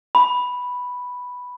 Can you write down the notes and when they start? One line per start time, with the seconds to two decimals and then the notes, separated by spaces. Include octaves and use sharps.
0.15 B5